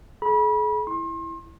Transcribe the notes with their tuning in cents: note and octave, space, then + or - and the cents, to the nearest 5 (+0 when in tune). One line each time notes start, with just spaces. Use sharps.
G#4 +45 B5 -30
E4 +0 C6 +35